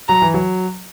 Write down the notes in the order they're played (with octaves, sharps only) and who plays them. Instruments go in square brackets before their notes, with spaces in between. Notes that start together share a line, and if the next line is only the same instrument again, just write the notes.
[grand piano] F#3 [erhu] A#5
[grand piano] E3
F#3